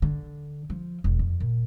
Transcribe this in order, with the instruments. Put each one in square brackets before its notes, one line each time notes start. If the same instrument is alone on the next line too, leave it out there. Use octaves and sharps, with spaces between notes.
[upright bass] D3
F3
E1
F2
A#2